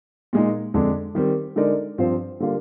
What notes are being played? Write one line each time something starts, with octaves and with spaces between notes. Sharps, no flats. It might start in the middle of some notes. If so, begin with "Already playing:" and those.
A#2 G#3 D#4
F2 D3 G#3 D4
D#3 G3 C4
D3 G#3 D#4 A#4 D5
G2 F3 C4 F4 C5
D3 G3 A#3 F4